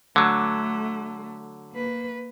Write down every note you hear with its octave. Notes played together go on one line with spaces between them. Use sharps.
D3 F#3 A3
A#3 B4